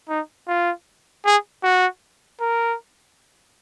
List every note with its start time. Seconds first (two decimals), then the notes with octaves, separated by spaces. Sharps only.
0.09 D#4
0.48 F4
1.25 G#4
1.63 F#4
2.41 A#4